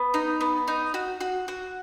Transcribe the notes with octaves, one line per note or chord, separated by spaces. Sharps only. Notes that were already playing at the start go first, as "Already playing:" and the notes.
Already playing: B3
D#4
B3
D#4
F#4
F#4
F#4